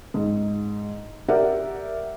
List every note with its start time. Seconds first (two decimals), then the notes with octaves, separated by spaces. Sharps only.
0.14 G#2
1.28 G4 A#4 D5 E5 F#5